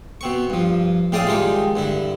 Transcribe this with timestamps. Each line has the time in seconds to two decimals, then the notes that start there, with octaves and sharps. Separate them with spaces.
0.21 B2 C4 C#6
0.50 G2 F3
1.12 A2 C4 G#4 D5 F5 D#6
1.27 D#3 G3 G#3 D#4 F4 G#4
1.76 G2 D3 E4